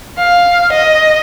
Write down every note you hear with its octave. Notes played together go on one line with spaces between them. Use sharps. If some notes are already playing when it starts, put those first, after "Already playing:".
F5
D#5